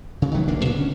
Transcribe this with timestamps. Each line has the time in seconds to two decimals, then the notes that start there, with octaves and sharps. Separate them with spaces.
0.22 D2 C#3
0.34 D#3 E3 F#3 A3
0.48 D1 B1 A#3 D4
0.62 D2 A#2 C#3 A#3
0.76 D3 C#4